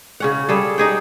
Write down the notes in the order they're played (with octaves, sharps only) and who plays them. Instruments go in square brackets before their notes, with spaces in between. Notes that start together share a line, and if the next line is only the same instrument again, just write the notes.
[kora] C#3 C#4 F#5
G3 G#4 A4
D#4 G#4 G5